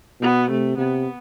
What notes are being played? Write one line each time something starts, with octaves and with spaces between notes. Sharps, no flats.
B2 B3
C3 A3
C3 B3